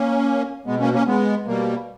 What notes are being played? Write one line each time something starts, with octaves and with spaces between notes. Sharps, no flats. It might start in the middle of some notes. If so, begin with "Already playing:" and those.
Already playing: A#3 C#4
B2 G#3 B3
A#3 C#4
A#3 C#4
G#3 B3
B2 G3 A#3